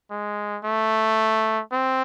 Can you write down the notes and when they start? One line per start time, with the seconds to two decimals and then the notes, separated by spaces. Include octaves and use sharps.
0.10 G#3
0.64 A3
1.72 C4